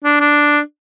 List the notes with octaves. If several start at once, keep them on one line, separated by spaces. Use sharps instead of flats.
D4
D4